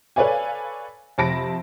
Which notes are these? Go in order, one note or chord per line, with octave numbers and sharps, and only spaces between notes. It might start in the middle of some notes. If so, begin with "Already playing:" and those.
A4 B4 C#5 D5 F5 G#5
F2 C3 A5 B5 A#6 D7